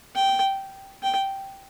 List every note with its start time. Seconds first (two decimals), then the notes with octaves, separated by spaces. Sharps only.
0.15 G5
1.03 G5